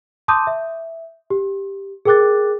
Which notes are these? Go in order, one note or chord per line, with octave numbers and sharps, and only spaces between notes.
A5 C6 D6 D#6 G6 D#7
E5
G4
G#4 A#4 G5 D6 F#6 A6